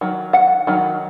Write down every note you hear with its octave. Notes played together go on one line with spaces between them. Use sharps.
D#3 F#3
F#5
D#3 F#3